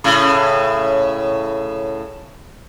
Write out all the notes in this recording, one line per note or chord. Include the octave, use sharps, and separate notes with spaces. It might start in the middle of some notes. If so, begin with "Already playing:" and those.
A2 C#3